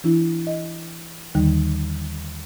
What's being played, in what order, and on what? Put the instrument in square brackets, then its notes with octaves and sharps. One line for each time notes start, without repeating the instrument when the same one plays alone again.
[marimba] E3 D4 E4
D#5
D#2 D3 D#3 G3 D#4